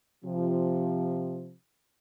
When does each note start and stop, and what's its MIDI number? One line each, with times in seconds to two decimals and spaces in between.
0.24 1.53 48
0.24 1.53 53